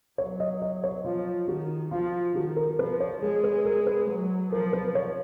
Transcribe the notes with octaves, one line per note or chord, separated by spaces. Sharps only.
F#3 C#5
D#5
D#5
C#5
F3 F4
D#3 F#4
F3 F4
D#3 F#4
A#4
F3 B4
C#5
G#3 G#4
B4
A#4
B4
F#3
F3 A#4
B4
C#5